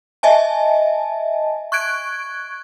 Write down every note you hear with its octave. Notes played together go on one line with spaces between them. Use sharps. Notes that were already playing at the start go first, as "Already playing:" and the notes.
D#5 E5 G#5 A5
C#6 F#6 G#6 D7